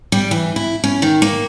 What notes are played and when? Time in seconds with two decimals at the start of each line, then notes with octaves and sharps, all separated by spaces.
0.12 G3
0.31 E3
0.56 E4
0.84 C#4
1.02 D#3
1.22 A#3